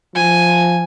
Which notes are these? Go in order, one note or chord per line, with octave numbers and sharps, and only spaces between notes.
F3 G#5